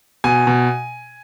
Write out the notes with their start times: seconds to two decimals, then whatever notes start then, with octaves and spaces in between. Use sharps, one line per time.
0.24 B2 G#5
0.47 B2